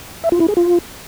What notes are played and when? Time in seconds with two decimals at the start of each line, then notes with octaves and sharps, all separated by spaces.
0.24 E5
0.32 F4
0.40 E4
0.49 G#4
0.57 F4